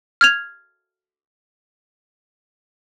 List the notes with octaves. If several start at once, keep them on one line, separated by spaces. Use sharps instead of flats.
F6 G#6 F7